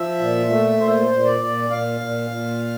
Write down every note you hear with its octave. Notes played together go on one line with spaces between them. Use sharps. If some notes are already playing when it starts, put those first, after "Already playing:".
Already playing: F3 E5
A#2
A3
A#2 C5
A#2
D5
A#2
A#2 F5
A#2
A#2